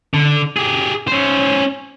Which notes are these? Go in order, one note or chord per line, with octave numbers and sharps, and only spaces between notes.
D3
G4 G#4
C#4 C5